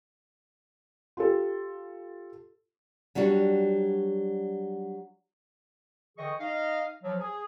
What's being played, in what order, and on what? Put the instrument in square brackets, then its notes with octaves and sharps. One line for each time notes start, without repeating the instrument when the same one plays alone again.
[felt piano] F4 G4 A4
[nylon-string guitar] F#3 G3 D4 F#4
[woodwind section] D3 E3 G#4 D#5 G5 C#6
D#4 D#5 F5
F3 F#3
G#4